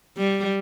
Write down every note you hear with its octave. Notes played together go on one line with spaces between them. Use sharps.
G3